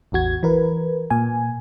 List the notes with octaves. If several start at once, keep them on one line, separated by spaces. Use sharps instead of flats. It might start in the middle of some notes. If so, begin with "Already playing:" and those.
A1 E2 F#4 G#6
E3 A#4 B4
A#2 G#5